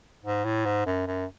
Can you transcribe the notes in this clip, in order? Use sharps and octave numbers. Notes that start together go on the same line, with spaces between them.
G#2
A2
G#2
F#2
F#2